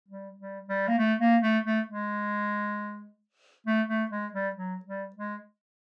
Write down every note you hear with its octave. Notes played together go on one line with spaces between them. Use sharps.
G3
G3
G3
A#3
A3
A#3
A3
A3
G#3
A3
A3
G#3
G3
F#3
G3
G#3